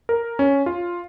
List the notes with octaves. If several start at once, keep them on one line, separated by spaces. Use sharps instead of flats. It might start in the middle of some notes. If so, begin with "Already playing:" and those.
A#4
C#4
F4